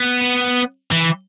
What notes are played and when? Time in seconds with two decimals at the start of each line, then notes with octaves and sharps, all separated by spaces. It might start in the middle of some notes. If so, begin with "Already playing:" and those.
Already playing: B3
0.92 E3